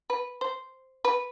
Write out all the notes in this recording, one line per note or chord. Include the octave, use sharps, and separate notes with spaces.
B4
C5
B4